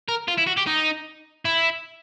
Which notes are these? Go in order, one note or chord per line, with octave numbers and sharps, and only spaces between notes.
A#4
F4
E4
F#4
G4
D#4
E4